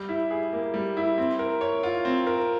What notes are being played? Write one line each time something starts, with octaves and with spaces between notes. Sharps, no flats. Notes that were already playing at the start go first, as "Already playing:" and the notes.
Already playing: G3
E4
G#4
A#3
G3
E4
C4
A#4
C#5
F4
C4
A#4